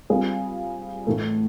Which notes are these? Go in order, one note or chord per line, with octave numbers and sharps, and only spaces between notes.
G3 C4 F4 G#4
A2 E3 A3